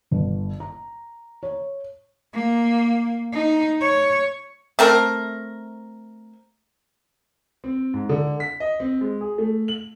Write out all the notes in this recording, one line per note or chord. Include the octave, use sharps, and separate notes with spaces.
G1
A#5
C#5
A#3
D#4
C#5
A3 C4 A#4
C4
G#2
D3
B6
D#5
C4
G#3
G#4
A3
F#7